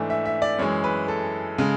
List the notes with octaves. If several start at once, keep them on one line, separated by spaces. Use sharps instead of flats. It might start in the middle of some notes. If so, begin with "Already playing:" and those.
Already playing: G#2 E3 A3 D4
E5
E5
D5
F#2 E3 G#3 C#5
B4
A4
C#3 G#3